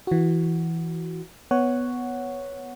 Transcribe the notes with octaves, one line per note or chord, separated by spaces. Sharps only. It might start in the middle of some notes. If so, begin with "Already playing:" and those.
E3 F#4
B3 C#5 F#5